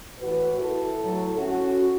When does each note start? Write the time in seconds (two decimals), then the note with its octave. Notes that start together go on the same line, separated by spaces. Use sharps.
0.19 A2 E3 F#4 B4
0.60 E4 A4
0.99 A2 F#3
1.38 C#4 F#4